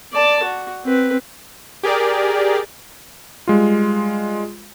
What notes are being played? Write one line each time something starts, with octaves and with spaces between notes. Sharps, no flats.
D5 A5
F#4
C4 B4
G4 G#4 A#4 D5
G3 G#3 F4